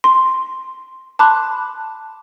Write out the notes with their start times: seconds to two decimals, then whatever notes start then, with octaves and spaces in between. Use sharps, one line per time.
0.04 C6
1.19 A5 B5 C6 D6 F#6